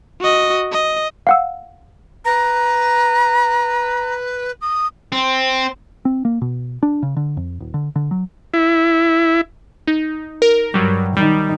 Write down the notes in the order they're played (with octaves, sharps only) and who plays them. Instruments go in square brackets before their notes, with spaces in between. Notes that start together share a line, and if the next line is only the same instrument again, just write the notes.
[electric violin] F#4 D#5
D#5
[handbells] F5 F#5 E6
[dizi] B4 [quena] A#5
[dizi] D#6
[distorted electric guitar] C4
[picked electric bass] C4
A#3
B2
D4
C#3
D3
F2
D#1
D3
D3
F#3
[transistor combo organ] E4
[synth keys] D#4
A#4
[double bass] G2 [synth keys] F#3 G3
[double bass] D#3 D#4 [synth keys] G3